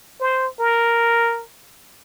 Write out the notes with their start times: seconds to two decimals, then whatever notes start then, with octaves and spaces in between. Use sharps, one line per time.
0.20 C5
0.60 A#4